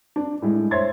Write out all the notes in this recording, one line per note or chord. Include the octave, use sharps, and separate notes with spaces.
D4
A2 G#3
C5 C#5 E5 C6 G#6 A6